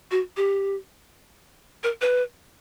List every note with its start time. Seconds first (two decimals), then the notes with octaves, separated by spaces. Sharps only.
0.11 F#4
0.37 G4
1.84 A#4
2.01 B4